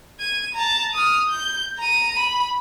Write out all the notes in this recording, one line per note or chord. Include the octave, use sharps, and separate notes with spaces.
G#6 D#7
A5 A#5
D#6 F6
G6
A#5 D#7
B5